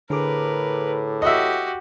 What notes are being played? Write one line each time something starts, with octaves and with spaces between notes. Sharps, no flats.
A2 D3 G#4 A#4 B4 D6
F#4 G4 D#5 E5